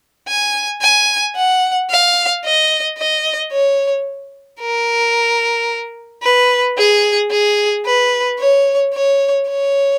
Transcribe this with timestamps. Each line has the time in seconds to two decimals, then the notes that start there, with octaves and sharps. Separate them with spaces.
0.28 G#5
0.82 G#5
1.36 F#5
1.90 F5
2.45 D#5
2.98 D#5
3.52 C#5
4.62 A#4
6.23 B4
6.78 G#4
7.31 G#4
7.86 B4
8.40 C#5
8.94 C#5
9.48 C#5